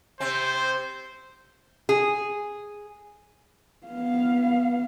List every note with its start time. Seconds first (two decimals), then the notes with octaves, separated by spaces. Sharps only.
0.20 C3 C4 C5
1.89 G#4
3.87 B3 F5